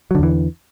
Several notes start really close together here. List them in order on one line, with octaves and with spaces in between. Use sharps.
F#3 D3 E2 E3